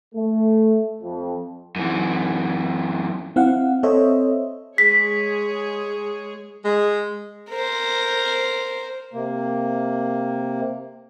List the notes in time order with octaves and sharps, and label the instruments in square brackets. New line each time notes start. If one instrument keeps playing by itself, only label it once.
[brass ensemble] A3
F2
[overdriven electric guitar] F#2 E3
[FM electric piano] C4 E4 F5 F#5
C4 A4 C5 C#5 D#5 E5
[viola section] G#3 G#4 C#5 [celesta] B6
[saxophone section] G#3
[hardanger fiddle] A#4 C5
[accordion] C3 A#3